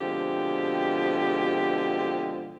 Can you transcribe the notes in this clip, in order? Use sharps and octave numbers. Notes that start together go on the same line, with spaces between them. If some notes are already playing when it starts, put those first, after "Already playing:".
B2 D3 F3 G#3 C4 G4